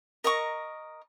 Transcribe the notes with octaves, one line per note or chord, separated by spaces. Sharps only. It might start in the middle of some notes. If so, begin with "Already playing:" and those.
A#4 D#5 A#5 C#6